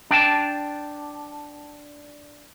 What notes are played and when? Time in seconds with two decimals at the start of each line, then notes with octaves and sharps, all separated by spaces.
0.11 D4 G5 A5